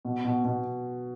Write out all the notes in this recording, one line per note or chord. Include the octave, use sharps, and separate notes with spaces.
B2
B2
B2